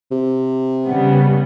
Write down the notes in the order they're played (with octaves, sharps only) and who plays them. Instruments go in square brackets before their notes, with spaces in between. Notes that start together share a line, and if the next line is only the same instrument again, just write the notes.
[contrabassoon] C3
[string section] C#3 G3 B3